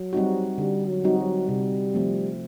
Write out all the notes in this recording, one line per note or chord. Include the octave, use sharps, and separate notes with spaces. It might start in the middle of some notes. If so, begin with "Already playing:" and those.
Already playing: F#3
G3 C4 D#4 F#4
D3 G3
F#3
G3 C4 D#4 F#4
F#3
C3 G3
F3 A3 C4